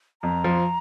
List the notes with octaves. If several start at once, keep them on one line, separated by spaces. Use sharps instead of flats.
F2 A#5
F3